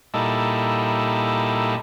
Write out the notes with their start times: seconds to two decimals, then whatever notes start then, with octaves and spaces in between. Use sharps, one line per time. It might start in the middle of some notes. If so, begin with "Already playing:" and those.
0.14 A#2 G3 D#4 E4 A4